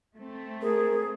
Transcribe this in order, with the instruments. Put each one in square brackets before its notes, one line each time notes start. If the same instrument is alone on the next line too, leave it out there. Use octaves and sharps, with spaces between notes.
[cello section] A3 C4
[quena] G#4 [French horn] A#4